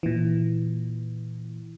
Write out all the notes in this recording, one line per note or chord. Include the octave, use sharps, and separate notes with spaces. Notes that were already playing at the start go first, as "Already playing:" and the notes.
A#2 E3